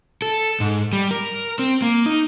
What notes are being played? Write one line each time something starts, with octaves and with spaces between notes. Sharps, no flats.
A4
G#2
G3
A#4
C4
A#3
D#4